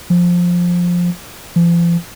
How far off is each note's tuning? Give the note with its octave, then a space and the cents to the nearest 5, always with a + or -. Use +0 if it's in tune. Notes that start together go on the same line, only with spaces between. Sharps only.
F3 +10
F3 -40